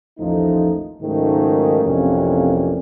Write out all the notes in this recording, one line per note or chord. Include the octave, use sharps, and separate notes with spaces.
A1 D#2 F3 A3 D#4
C#2 G#2 D#3 F#3 A3 A#3
A1 F2 C3 A#3 C#4 D4